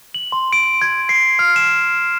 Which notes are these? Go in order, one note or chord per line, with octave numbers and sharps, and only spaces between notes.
F#7
C6
D7
G#6
C7
F6
E7